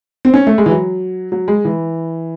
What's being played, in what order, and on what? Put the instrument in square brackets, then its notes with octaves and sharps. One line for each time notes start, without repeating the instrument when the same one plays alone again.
[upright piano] C4
C#4
A3
G#3
E3
F#3
F#3
G#3
E3